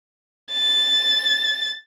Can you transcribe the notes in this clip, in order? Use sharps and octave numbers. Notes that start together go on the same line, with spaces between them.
A6